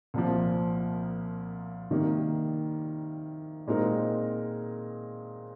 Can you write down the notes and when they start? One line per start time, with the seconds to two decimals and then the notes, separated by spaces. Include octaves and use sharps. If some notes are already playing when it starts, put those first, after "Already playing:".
0.14 C2 A#2 F3
1.91 C3 D#3 G3 A#3
3.67 A#2 G#3 C4 D#4 A#4